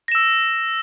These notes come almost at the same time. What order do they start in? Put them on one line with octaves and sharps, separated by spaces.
A#6 E7 E6